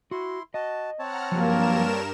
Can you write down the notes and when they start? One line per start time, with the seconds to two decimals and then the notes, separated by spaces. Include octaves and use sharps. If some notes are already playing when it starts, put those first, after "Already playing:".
0.11 E4 F#4 C6
0.54 F#4 D#5 A5
0.99 C4 C#5 F#5 A5 A#5 F6
1.32 G2 F3 F#3 A#3 G4 A#4 E7